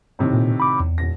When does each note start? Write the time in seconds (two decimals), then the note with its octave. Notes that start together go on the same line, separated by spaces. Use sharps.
0.19 A2 C3 D#3
0.33 A#2
0.60 B5 D6
0.80 E2
0.98 D#1 A#6